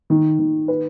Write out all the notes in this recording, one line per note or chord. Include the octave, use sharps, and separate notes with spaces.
D#3
D#3
B4